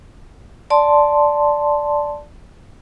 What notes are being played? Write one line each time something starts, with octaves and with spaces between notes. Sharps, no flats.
D5 A5 C6